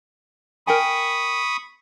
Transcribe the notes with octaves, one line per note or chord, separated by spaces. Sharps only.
A#4 G5 G#5 B5 C#6 D#6